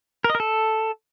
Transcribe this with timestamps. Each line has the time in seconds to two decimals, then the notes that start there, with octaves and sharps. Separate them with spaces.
0.24 A#4
0.30 D#5
0.35 A#4
0.40 A4